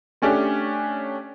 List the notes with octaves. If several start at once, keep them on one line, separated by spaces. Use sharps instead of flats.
A3 C#4 D4 G4